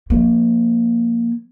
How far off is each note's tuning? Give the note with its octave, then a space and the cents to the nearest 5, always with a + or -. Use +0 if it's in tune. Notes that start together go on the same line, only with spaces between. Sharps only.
F3 +10 A#3 +0